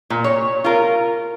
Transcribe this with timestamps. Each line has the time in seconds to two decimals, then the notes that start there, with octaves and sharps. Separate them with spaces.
0.10 A#2
0.24 C#5
0.64 F4 A#4